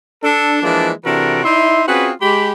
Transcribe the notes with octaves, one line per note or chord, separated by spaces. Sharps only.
D4 A4
E3 F3 G#3 A#3 D4
C3 E3 D4 F#4 A4 A#4
D#4 E4 D5 E5 C6
C4 C#4 F4 F#4 G#4 B4
G#3 G4 B5